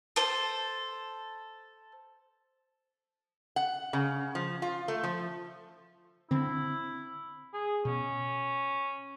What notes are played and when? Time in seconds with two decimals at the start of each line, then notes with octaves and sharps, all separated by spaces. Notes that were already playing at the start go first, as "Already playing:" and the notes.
0.16 A4 C5
3.56 F#5
3.93 C#3
4.35 F3
4.62 F4
4.88 A3
5.03 F3
6.31 D3 C4 E4
7.54 G#4
7.85 B2 C#4